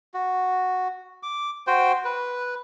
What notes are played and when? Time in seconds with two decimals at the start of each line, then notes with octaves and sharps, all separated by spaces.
0.14 F#4
1.23 D6
1.67 F#4 C5 G5
2.05 B4